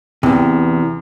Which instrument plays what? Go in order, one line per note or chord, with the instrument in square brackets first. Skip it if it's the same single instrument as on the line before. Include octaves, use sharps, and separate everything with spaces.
[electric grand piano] E2 [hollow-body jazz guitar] C3 E3